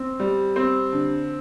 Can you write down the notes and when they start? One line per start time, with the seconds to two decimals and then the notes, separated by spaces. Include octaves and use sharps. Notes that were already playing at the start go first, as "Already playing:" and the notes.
Already playing: C4
0.20 G3
0.56 C4
0.93 D3